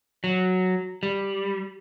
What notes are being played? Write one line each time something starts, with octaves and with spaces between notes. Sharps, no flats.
F#3
G3